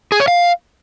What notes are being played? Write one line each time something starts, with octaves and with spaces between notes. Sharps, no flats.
G#4
C#5
F5